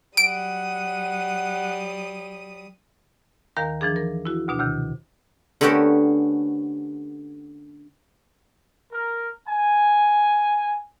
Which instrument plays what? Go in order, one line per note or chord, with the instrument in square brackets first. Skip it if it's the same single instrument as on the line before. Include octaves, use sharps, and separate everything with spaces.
[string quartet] F#3 G3 D#6 [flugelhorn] F#5 [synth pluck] D7
[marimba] D#2 D#3 A#4 F5 A#5
E3 F3 D4 G#4
A#4
E4 F#4
D2 B2 D4
D2 C3 D#3
[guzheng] D3 A3 B3 C#4 G4 A#4
[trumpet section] A#4
G#5